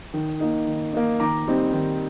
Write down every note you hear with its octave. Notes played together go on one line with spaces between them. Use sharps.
D#3
A#3 D#4
D#3
A#3 D#4
D#3 A#5 D6
G3 C4 D#4
D#3